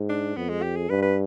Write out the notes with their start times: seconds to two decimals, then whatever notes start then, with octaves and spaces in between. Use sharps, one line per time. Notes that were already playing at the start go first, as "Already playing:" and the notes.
Already playing: G#2
0.10 D4
0.37 F2 B3
0.49 G#3
0.62 G4
0.76 G#4
0.89 G2 B4
1.03 B4